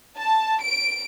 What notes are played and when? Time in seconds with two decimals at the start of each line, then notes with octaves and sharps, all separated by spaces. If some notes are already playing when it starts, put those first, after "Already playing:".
0.17 A5
0.62 D7